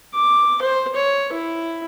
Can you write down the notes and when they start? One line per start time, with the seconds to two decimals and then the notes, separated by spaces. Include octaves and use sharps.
0.15 D6
0.62 C5
0.95 C#5
1.33 E4